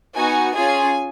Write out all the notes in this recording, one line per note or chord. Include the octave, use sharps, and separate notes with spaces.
B3 D#4 F#4 G#5
C#4 F4 G#4 G#5